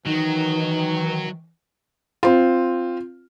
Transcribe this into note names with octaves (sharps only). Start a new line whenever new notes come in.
D#3 E3 F#3 D#4
C4 F4